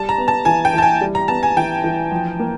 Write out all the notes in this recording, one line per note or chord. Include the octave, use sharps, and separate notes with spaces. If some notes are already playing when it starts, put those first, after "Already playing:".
Already playing: G3 A5
A#5
B3
A5
E3 G#5
G5
E3 A5
G#5
G3
A#5
B3 A5
G#5
E3 G5
E3
F3
A#3